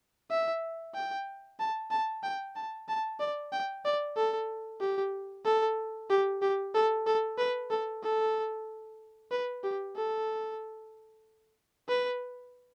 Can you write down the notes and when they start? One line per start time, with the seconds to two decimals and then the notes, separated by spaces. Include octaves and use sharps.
0.30 E5
0.95 G5
1.60 A5
1.91 A5
2.23 G5
2.56 A5
2.88 A5
3.20 D5
3.52 G5
3.85 D5
4.16 A4
4.81 G4
5.45 A4
6.10 G4
6.42 G4
6.74 A4
7.06 A4
7.38 B4
7.70 A4
8.03 A4
9.31 B4
9.63 G4
9.96 A4
11.88 B4